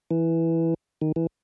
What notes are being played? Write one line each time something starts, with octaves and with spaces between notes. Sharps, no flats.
E3
D#3
E3